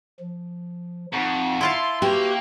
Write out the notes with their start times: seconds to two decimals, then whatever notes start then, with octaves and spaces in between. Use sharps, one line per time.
0.20 F3
1.13 F2 D#4 F#5 C#6
1.61 E4 F4 A5 C6
2.02 A#3 F#4 G4 B4 C#6